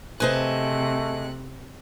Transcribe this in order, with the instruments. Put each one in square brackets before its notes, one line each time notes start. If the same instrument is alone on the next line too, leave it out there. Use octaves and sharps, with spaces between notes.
[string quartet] C3 F#6 [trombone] A3 [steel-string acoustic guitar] G#4 D#5 A5 [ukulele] B4 C5